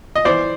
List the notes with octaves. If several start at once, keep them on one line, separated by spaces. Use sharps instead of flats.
D#5
E3 C5 D5